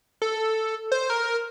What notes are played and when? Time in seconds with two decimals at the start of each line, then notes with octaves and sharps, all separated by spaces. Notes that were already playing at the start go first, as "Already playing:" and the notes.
0.22 A4
0.92 C5
1.10 A#4